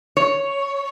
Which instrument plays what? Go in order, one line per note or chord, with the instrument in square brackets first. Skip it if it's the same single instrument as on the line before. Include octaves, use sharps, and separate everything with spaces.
[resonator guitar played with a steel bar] C#5